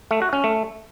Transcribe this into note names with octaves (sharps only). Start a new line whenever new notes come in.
A3
F#4
C#4
A3